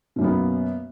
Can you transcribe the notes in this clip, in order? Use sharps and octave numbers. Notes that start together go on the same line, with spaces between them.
F#2 B2 A#3 B3